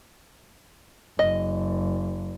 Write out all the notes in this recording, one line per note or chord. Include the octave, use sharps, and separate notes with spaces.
F#1 D#5